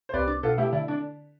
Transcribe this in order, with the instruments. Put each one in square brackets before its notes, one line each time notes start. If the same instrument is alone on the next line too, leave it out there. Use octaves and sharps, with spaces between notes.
[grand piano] C5
[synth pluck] C2 [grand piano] B4 D5
[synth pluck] D4
[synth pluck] B2 [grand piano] F4 A4
[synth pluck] A3 [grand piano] E4 G4
[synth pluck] D3 [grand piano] E4
[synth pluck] D3 [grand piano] D4